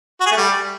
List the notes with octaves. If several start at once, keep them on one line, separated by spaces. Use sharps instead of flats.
F#4
G#4
A3
G3